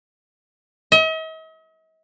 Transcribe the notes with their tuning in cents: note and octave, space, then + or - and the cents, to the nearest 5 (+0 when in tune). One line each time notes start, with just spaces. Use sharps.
D#5 +45